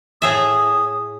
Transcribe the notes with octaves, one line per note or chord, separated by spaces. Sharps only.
A2 G#4 E5 D#6